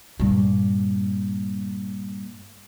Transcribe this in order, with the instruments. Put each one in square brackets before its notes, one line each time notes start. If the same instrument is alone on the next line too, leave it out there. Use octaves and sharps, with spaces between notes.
[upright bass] G2 A#2